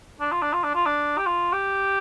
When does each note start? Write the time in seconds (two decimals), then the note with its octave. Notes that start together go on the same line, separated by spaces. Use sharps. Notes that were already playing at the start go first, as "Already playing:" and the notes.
0.21 D4
0.32 F4
0.42 D4
0.53 F4
0.64 D4
0.75 F4
0.86 D4
1.18 G4
1.26 F4
1.53 G4